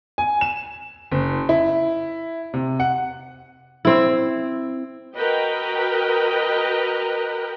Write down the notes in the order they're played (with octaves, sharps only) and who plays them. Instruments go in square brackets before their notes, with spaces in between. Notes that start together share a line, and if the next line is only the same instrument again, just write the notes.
[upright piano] G#5
E7
F#1
E4
C3
F#5
[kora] C4 E4
[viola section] F#4 A#4 B4 D#5 G5